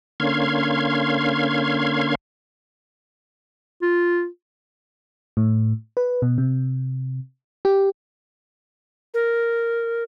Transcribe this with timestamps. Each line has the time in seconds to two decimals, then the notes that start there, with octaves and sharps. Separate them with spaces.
0.20 D3 A#3 C#4 F5 C6 G#6
3.82 F4
5.37 A2
5.97 B4
6.22 B2
6.38 C3
7.65 G4
9.14 A#4